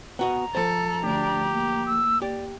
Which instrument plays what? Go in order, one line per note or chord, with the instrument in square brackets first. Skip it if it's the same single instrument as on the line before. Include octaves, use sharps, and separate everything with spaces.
[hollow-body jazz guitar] B3 F#4 D#5 [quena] A#5
[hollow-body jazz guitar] F3 C5 [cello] A4
[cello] D2 D4 [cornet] G4
[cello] A#3
[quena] E6
[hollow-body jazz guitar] G4 [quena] D5